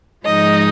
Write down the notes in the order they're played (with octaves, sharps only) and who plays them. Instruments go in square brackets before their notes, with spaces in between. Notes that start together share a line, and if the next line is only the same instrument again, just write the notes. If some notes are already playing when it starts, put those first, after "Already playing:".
[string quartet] G#2 F3 G#3 D#4 D#5